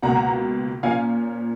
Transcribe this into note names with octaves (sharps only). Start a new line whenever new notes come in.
C#2 B2 A#3 F#5 A#5
A#2 F3 A#3 C#4 F5 G#5